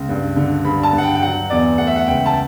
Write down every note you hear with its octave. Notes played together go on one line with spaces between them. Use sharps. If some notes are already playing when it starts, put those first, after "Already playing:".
Already playing: C#2
G2
D3
G2 B5
A5
G2
F#5
G5
G5
F#3 F#5
E2 D5
A3 F#5
E5
F#5
C#2 G5
A5